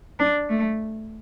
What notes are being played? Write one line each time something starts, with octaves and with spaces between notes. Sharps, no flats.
D4
A3